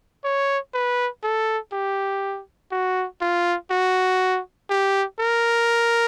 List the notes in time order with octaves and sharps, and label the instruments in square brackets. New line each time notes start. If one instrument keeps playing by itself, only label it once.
[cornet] C#5
B4
A4
G4
F#4
F4
F#4
G4
A#4